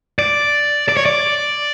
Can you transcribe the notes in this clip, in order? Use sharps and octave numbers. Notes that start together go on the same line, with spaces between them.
D5
D5
C#5
D5